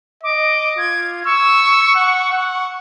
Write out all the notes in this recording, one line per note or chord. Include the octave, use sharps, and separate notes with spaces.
D#5 D6
F4 G#6
C#6 E6
F#5
F#5